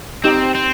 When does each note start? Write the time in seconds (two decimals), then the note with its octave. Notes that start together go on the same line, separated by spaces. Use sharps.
0.24 C4 D#4 G4
0.55 C4